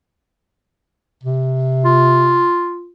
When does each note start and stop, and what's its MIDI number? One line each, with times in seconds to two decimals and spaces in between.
1.23 2.47 48
1.85 2.92 65